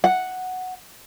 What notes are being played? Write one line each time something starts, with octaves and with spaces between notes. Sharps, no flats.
F#5